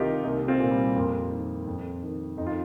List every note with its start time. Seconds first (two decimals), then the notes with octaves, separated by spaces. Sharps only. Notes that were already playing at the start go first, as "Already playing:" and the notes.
Already playing: C2 C3 D#3 D#4 F4 G4 A#4
0.24 C2 A#3 D#4
0.48 C4 F4
0.60 A#2
0.71 G3
0.95 F2 A#3
1.31 D#3
1.67 F2
2.03 D#3
2.37 F2 D#4
2.46 F4